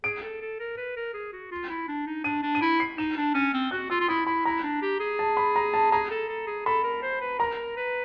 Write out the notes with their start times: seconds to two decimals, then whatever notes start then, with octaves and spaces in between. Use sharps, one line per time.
0.04 G#4 D7
0.22 A4
0.41 A4
0.60 A#4
0.77 B4
0.96 A#4
1.14 G#4
1.33 F#4
1.51 F4
1.69 E4
1.88 D4
2.07 D#4
2.24 D4 D#7
2.43 D4
2.55 D#7
2.61 E4 D7
2.80 C7
2.98 D#4 E7
3.17 D4
3.34 C#4 A6
3.53 C4
3.71 F#4 F#6
3.90 F4 E6
4.00 F4
4.08 E4 D#6
4.26 E4 B5
4.45 E4 A#5
4.63 D4
4.82 G4
5.00 G#4
5.19 A5
5.37 B5
5.56 A#5
5.74 A5
5.92 G#4 A#5
6.11 A4
6.29 A4
6.47 G#4
6.66 A4 B5
6.84 A#4
7.03 C5
7.21 B4
7.39 A#4 A#5
7.77 B4